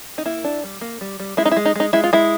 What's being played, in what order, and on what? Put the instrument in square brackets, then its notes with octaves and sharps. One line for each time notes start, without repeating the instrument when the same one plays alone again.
[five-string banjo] D#4
A#3 E4
D4
G3
A#3
G3
G3
G#3 E4
D#4
E4
G#3
D#4
G#3 D#4
G#3 E4
F4
G#3 E4